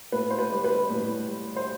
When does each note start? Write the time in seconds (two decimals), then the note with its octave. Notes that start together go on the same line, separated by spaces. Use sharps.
0.12 A2 B4
0.31 C5
0.39 B4
0.51 G3
0.64 B4
0.90 A2
1.28 G3
1.56 C5